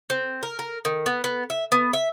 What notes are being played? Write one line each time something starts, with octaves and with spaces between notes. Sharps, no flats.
C4
A#4
A#4
D#3
B3
B3
E5
B3
E5